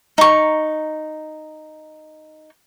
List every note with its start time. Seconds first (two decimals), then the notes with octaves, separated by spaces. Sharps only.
0.18 D#4 C#6